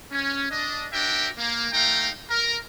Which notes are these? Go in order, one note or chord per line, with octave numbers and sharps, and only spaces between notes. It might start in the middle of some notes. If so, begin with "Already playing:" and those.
C#4
D4 D#5
D4 F#4 A#4 E5 G5
A#3
A3 D#4 F5 G5 A#5
A#4